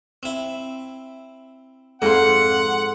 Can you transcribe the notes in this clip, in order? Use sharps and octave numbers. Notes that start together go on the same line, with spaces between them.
C4 E4
F2 G#2 F#5 C6